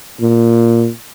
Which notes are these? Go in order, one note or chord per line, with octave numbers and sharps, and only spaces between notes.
A#2